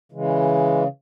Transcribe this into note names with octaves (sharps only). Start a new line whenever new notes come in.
C#3 E3 G#3